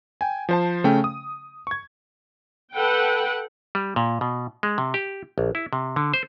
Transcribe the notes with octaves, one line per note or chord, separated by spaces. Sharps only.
G5 G#5
F3 C5 A5
C#3 A3 C#4 G5
D#6
C#6 G#6
A4 B4 F#5 G5
G3
A#2
B2
G#3
C3
G4
A#1
E4
C3
D3
C5